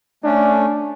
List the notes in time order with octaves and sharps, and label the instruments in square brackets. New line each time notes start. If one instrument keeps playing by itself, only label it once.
[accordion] A3 C#4 [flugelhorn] D4